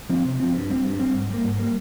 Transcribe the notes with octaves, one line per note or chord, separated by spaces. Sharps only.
F3 C4
C3
F3 C4
G2
G3 C4
G2
G3 C4
G#2
G3 A#3
G#2
G3 A#3